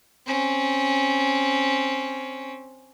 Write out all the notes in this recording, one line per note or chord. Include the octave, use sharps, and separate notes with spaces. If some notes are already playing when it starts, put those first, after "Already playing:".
C4 C#4